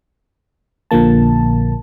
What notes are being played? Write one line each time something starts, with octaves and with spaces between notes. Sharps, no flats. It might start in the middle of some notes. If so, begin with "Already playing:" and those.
A#1 A#2 D3 F3 A#3 A5